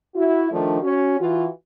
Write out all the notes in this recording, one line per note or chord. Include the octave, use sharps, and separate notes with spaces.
E4 F#4
D#3 F3 A3 D4
C#4 F#4
E3 F4 F#4